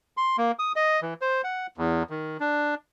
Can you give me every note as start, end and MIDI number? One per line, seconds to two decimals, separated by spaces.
0.17 0.37 84
0.38 0.52 58
0.59 0.72 87
0.76 1.00 75
1.02 1.14 52
1.21 1.42 72
1.44 1.67 78
1.77 2.03 40
2.10 2.37 51
2.40 2.75 62